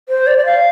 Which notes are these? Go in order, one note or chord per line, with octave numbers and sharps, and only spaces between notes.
C5
D5
D5
F5